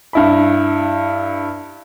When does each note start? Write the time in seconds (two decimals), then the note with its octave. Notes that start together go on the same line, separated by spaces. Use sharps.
0.13 G2 E4 B5